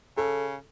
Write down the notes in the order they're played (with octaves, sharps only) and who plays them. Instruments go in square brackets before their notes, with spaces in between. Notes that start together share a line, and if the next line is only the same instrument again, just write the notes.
[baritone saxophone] C#3 [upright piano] A4